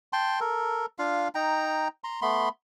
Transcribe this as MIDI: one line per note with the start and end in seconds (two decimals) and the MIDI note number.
0.13 0.40 79
0.13 0.40 81
0.13 0.40 84
0.41 0.86 69
0.41 0.86 70
0.99 1.28 62
0.99 1.28 65
0.99 1.28 77
1.35 1.88 63
1.35 1.88 79
1.35 1.88 82
2.04 2.20 82
2.04 2.20 84
2.22 2.49 57
2.22 2.49 59
2.22 2.49 83
2.22 2.49 84